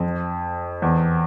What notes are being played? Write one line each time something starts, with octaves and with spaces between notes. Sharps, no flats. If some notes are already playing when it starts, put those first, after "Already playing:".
Already playing: F2
E2